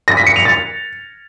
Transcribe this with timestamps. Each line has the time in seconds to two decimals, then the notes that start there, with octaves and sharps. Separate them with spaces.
0.08 A#6
0.17 B6
0.27 C#7
0.36 F7
0.45 A6